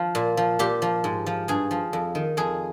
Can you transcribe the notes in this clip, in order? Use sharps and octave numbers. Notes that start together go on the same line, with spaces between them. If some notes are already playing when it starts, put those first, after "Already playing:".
Already playing: F3 F4
A#2
F3
A#2 G4
F3
G#2
F3
G2 G#4
F3
F2
D#3
F2 G#4